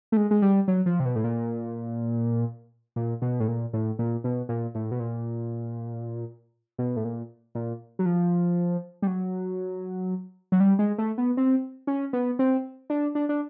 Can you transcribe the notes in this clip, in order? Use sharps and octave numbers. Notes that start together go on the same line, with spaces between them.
A3
G#3
G#3
G3
F#3
F3
C3
B2
A2
A#2
A#2
B2
A2
A#2
A2
A#2
B2
A#2
A2
B2
A#2
B2
A2
A#2
A#2
F#3
F3
G3
F#3
F#3
G3
G#3
A3
B3
C4
C#4
B3
C4
D4
D4
D4